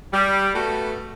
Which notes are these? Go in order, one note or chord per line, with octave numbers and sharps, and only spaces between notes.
G3
A3 B3 F#4